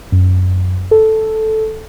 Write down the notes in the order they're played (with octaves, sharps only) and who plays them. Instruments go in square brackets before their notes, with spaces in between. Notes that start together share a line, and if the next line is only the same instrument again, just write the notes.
[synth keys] F#2
A4